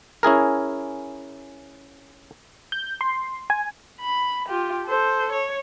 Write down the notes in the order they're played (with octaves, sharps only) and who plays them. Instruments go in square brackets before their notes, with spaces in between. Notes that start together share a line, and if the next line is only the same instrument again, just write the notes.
[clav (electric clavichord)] C#4 E4 G#4 A#4
[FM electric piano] G6
C6
G#5
[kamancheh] B5
F4 G4
A4 C5
C#5